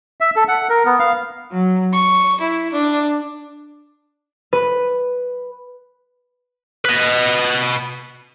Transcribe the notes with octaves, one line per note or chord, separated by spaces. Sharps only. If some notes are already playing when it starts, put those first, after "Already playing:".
E5
A4
F#5
A#4
B3
F5
F#3
C#6
E4
D4
B4
B4 D#5